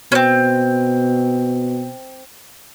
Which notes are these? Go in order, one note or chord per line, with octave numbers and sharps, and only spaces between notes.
B2 C4 C#4